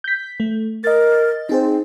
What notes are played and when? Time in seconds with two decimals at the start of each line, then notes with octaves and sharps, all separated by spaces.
0.04 G6 B6
0.40 A3
0.84 A#4 D#5 A6
1.49 C4 D#4 G#4 C5